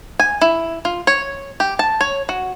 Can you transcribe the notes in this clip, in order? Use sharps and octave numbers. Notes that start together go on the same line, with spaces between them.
G#5
E4
F4
C#5
G4
A5
C#5
F#4